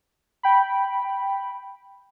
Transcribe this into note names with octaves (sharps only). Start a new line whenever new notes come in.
G5 B5